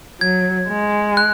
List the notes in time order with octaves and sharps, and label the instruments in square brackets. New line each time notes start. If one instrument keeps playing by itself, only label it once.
[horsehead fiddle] F#3 [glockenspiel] G#6
[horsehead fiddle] G#3
[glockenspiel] F#6